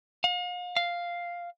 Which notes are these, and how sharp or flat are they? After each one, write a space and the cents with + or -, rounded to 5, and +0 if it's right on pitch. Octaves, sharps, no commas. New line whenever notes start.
F5 +40
F5 +0